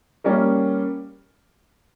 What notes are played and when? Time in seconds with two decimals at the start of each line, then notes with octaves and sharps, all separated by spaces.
0.24 G3 A#3 C#4